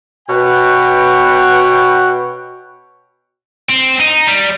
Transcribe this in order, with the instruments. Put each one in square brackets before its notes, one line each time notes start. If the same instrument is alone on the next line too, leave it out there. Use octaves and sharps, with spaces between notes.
[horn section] B2 B4 C#5 F#5 G5
[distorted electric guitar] C4
D#4
G3